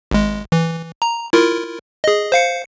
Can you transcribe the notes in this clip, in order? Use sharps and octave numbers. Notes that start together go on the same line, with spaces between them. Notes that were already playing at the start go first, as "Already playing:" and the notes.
G#1 G#3
E3
A#5
E4 F4 A#4
G#4 D#5
C5 F5 C#7